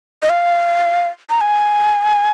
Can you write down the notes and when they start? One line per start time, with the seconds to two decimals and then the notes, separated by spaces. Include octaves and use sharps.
0.22 D#5
0.29 F5
1.30 A#5
1.41 G#5